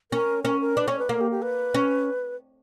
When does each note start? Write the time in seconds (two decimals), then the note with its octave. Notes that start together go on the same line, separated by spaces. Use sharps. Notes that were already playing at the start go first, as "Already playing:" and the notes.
0.12 C#4 A#4
0.44 C#4 A#4
0.61 A#4
0.77 D4 B4
0.88 C#4 C#5
0.99 B4
1.09 A#3 A#4
1.21 G4
1.31 G4
1.42 B4
1.74 C#4